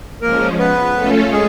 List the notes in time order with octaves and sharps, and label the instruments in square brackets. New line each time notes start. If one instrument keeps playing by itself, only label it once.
[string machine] F3 G#3 C#4 [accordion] A#3 A#4
[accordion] B3 B4
[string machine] A3 C#4 F4 A4
[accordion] G#3 G#4